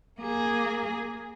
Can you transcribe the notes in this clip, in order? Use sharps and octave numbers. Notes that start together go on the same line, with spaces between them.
A#3 G#4